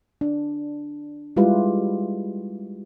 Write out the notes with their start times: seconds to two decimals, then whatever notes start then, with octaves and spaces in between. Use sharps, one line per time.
0.21 D4
1.36 G3 G#3 E4 F4 G4 B4